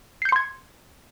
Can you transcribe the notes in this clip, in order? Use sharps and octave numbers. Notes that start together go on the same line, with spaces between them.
C6 G6 G#6 C7 C#7